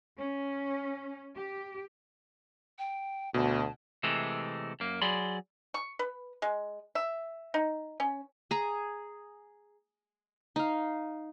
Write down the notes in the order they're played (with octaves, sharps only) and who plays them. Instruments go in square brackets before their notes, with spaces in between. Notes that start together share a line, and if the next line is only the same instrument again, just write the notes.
[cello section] C#4
G4
[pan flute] G5
[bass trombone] D2 [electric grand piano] B2 [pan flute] A5
[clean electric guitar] C3 E3 G#3 A3 C4
F#2 A#3
F#3 G#4 D5 B5 C6
[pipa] C#6
B4
G#3
E5
D#4
C#4
[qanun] G#4 A#5
D#4 F5